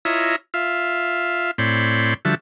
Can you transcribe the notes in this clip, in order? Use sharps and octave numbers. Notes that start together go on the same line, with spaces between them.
E4 F4 C#5 D#5 E5 A#5
F4 E5 F5
A2 C4 C#5 D5 B5 C6
D3 F3 G3 F#4 E5 A5